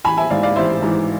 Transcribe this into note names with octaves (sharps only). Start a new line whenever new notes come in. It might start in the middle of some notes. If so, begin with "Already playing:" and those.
A1 G#5 B5
E5 G#5
G#2 E3 D5 F5
D5 F5
A1 C5 E5
G#2 E3